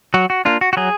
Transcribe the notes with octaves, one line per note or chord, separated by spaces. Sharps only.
F#3 F#4
F#4
A#3 D4 F4
F#4
F#4
F#3 G#4